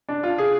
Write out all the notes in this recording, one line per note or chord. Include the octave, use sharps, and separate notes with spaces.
D4
F4
G#4